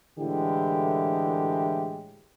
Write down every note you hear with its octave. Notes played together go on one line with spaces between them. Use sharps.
A2 D3 E3 G#3 E4 G4